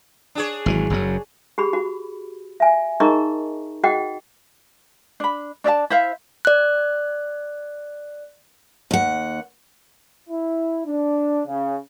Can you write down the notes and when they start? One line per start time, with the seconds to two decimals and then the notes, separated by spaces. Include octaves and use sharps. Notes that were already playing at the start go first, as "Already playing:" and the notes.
0.35 D4 G#4 C#5
0.66 G#1 E3 F#3
0.90 F#1 F#2 F#3
1.58 G4 G#4 B5
1.73 F#4
2.60 E5 G#5
3.00 D#4 G#4 A#4 D#5 A#5 C#6
3.84 F#4 G#4 D#5 F#5 G5
5.20 D4 B5
5.64 D4 D5 E5 A5
5.90 E4 C5 E5 F5
6.45 D5 F#6
8.91 D#2 F#5
10.29 E4
10.86 D4
11.46 C#3